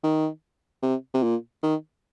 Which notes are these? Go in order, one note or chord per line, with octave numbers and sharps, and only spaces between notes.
D#3
C3
C3
A#2
D#3